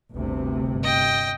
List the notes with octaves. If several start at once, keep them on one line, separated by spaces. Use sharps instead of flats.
G1 D2 C3
D#5 G5